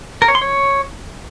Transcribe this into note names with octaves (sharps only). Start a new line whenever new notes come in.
A#4
C#5
C6
C#5